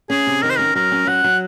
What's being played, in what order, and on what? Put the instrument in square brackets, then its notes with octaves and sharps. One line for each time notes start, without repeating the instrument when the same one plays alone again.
[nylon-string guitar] C#4 [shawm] G#4
[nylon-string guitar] C3
[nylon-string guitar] D#3 [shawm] A#4
[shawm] C5
[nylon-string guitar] C#4 [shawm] A#4
[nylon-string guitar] F#3 [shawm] A#4
[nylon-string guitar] C#4
[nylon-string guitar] F#3 [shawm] F#5
[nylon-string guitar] F#3